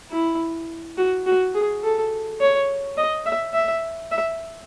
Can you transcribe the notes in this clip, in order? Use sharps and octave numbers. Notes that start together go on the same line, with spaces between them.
E4
F#4
F#4
G#4
A4
C#5
D#5
E5
E5
E5